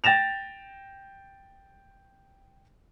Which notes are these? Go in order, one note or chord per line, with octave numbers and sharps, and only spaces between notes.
G5 A6 A#6 E7 F7